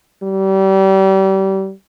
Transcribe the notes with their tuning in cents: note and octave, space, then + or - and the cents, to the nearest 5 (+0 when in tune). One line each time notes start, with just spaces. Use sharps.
G3 -30